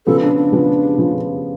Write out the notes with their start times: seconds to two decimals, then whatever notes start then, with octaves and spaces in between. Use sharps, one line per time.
0.06 C#3 F3 B3 A4
0.21 D4
0.37 D4
0.52 C#3 F3 B3
0.98 C#3 F3 B3